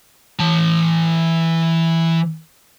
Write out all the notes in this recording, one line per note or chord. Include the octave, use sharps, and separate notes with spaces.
E3 A5